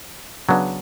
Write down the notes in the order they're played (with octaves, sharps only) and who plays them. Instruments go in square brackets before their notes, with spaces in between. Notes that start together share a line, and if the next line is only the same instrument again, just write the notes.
[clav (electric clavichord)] C#3 F#3 B3 D4